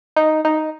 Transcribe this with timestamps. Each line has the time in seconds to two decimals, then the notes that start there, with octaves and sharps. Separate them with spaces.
0.16 D#4
0.45 D#4